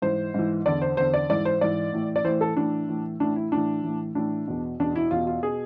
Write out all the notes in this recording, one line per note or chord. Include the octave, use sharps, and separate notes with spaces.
G#2 E3 C5
G#2 E3
E2 D3 D5
C5
E2 D3 C5
D5
G#2 E3 D5
C5
G#2 E3 D5
A2 E3
D5
A2 E3 C5
A4
A2 E3 D4
A2 E3
A2 E3 D4
E4
A2 E3 D4
A2 E3
A2 E3 D4
E2 B2
E2 B2 D4
E4
E2 B2 F4
F4
B2 G#4